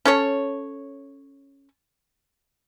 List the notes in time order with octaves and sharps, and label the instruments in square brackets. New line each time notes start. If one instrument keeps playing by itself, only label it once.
[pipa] C#4 A4 C#5